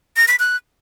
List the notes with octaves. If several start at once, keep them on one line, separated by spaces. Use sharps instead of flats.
A#6
B6
F#6